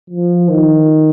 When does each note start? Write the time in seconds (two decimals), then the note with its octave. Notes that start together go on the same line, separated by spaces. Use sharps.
0.10 F3
0.49 D#3